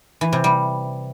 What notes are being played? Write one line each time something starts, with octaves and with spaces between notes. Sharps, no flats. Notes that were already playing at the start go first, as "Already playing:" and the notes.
E3
C3
G3